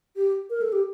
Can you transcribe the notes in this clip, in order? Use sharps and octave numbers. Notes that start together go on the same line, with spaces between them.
G4
A#4
A4
G4